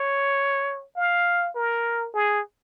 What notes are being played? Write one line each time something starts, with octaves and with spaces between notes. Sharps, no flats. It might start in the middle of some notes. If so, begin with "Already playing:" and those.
Already playing: C#5
F5
A#4
G#4